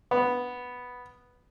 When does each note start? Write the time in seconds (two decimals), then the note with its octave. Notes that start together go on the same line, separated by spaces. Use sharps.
0.11 B3